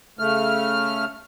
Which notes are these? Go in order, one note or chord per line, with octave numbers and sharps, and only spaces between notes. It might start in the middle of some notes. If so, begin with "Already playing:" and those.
C#3 A3 F6